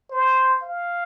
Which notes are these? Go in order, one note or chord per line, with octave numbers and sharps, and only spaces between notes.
C5
F5